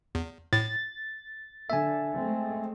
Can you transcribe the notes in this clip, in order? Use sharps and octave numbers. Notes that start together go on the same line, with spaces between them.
E2
A2 A6
D3 E5 G#5
G#3 A3 C4